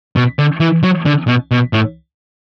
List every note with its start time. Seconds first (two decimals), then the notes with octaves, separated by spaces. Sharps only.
0.16 B2
0.39 D3
0.60 E3
0.83 F#3
1.06 D3
1.28 B2
1.51 B2
1.73 A2